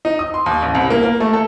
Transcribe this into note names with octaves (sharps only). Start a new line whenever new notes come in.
D#4
D#6
C6
D#2
A1
C2
A#3
A#3
A3
A4